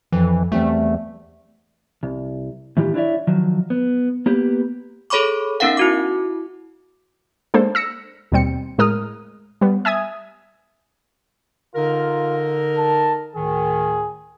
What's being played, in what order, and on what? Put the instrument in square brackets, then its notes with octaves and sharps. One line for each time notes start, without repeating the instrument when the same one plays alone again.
[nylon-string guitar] F2 [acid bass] E3
[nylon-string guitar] E2 G3 C4 [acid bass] A3
[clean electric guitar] C2
A2 D#3 E3 F4 G4
D4 E4 C#5 D5 E5
D#3 F3 F#3
B3
A#3 B3 G4 B4
[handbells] G#4 A4 C#5 B5 C#6 D6
B3 C#4 D#4 A#4 F5 F#5
E4 F#4 D6
[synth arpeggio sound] G#3 A#3 D4 A4 C5
E6 A#6 C#7
D#2 B2 G3 C4 C#7
A2 G#3 A#4 D#6 F6
G3 B3
E5 G#5 D#6 G#6
[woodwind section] D3 D#4 A#4 [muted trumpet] F4
[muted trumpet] A5
[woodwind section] D2 A2 D#3 [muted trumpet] G#4